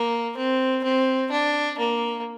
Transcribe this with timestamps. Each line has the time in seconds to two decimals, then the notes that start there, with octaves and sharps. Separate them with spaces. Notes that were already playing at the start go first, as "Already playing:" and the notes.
Already playing: A#3
0.37 C4
0.84 C4
1.31 D4
1.79 A#3